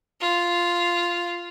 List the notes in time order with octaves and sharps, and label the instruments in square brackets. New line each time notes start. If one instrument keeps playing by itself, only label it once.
[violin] F4